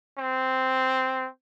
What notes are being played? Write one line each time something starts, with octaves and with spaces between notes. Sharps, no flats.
C4